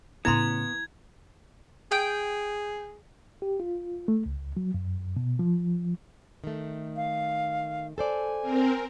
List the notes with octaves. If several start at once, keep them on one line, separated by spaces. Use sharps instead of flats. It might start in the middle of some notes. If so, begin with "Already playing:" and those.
A2 C#3 B3 E4 A#5 C6 G#6
G#4 G5
G4
F4
A3
C#2
F#3
F#2
B2
F3
D#3 A3
F5
A4 C5 D5 G#5
C4 A#4